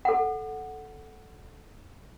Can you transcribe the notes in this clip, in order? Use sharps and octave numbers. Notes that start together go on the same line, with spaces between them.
A4 F#5